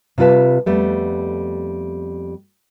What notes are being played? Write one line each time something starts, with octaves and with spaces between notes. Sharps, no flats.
C3 G3 F4 B4 A5
F2 G3 A3 B3